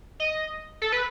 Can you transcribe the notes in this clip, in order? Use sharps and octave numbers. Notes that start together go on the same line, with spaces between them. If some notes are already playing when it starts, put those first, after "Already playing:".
D#5
A4
B4